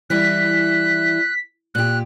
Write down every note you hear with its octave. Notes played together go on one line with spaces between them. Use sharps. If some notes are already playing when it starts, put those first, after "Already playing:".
E3 G3 E4 F#6 B6
A#2 G4 F#6